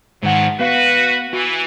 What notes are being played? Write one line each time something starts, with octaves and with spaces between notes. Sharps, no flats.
E2 G#2 D#3 F3 F#3 F#5
B3 F#4 B4 F5
E3 F#4